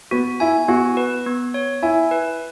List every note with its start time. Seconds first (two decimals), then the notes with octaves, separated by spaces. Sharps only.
0.11 B3 F#4
0.40 E4 G#5
0.68 B3 F#4
0.97 B4
1.26 B3
1.54 C#5
1.82 E4 G#5
2.11 B4